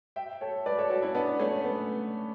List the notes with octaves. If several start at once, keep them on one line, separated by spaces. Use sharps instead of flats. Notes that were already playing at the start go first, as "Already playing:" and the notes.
E5 G5
A4 C#5
B4 D5
A4 C#5
F#4 A4
C#4 E4
B3 D4
A3 C#4
B3